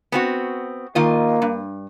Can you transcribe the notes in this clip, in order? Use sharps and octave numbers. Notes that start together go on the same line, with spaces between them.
B3 C4 F#4
D#3 A#3 F4 D#5
G2